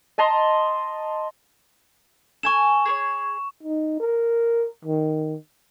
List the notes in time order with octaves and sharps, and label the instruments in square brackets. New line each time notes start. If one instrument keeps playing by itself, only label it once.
[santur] D#5 A5 A#5 C6
[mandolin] A4 G#5 [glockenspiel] C#6 E7
[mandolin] G#4 A#4 C#5
[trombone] D#4
A#4
D#3